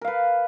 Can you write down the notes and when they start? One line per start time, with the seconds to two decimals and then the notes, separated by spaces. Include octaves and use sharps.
0.01 A#4
0.04 F5
0.08 B4